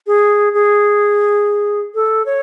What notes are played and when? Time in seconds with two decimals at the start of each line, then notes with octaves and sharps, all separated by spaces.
0.07 G#4
0.54 G#4
1.95 A4
2.26 C#5